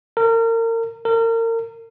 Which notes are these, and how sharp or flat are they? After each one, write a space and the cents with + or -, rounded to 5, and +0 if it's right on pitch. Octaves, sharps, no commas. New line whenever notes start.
A#4 -35
A#4 -35